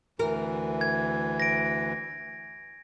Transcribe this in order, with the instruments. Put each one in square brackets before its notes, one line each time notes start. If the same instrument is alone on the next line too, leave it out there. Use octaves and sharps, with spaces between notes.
[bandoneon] D2 E3 [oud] A#4
[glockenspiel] G#6
A#6 D7